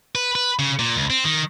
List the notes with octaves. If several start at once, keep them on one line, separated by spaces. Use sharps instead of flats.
B4
B4
C#3
A#2
C#2
C4
D#3